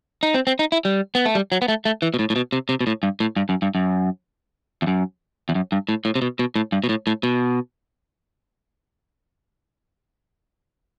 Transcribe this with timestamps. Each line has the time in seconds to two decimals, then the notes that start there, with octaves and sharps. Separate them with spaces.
0.23 D#4
0.34 C4
0.47 C4
0.59 D#4
0.72 E4
0.85 G3
1.15 B3
1.26 A3
1.35 G3
1.52 F#3
1.62 B3
1.68 A3
1.85 A3
2.02 E3
2.14 B2
2.19 A2
2.30 A2
2.36 B2
2.53 C3
2.69 C3
2.81 B2
2.87 A2
3.03 G2
3.20 A2
3.36 G2
3.49 F#2
3.62 G2
3.75 F#2
4.82 E2
4.87 F#2
5.49 E2
5.55 F#2
5.72 G2
5.89 A2
6.05 A2
6.15 C3
6.22 B2
6.39 B2
6.56 A2
6.72 G2
6.84 B2
6.89 A2
7.07 A2
7.23 B2